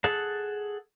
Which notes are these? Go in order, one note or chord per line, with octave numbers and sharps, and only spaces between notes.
G#4 A4 F#5 A5